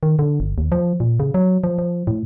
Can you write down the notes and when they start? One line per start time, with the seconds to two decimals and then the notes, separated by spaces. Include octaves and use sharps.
0.03 D#3
0.19 D3
0.40 G1
0.58 D#2
0.72 F3
1.00 A#2
1.20 C#3
1.34 F#3
1.64 F3
1.78 F3
2.07 A2